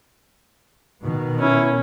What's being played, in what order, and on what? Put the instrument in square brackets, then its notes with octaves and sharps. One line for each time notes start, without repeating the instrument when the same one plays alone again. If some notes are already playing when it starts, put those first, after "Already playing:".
[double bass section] B2 D#3 B3
[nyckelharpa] C#4 [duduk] E4